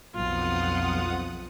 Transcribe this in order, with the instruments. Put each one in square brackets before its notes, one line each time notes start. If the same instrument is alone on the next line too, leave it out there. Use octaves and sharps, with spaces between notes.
[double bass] B1 [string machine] F2 F#5 D#6 [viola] F4